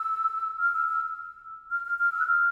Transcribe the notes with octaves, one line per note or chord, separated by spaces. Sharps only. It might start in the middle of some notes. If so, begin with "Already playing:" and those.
Already playing: E6
F6
E6
E6
F6
F6
F6
E6
F#6
F6